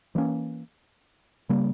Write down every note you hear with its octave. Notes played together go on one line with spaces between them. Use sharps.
E3 G3 A#3 C#4
C#3 G3 A#3